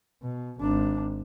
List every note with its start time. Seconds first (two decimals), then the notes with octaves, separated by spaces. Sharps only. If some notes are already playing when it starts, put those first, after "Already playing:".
0.22 B2
0.60 G#1 D4